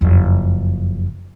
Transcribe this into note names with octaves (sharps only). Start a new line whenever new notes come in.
F#1 F2